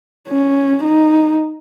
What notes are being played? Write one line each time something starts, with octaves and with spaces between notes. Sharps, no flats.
C#4
D#4